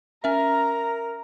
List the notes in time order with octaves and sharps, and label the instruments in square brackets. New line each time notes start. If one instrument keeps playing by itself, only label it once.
[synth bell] C#4 E5 [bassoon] A#4 [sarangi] A#5